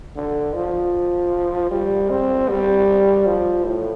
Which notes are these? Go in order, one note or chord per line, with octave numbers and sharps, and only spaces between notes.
D3
F3
G3
C4
G3
F3
A2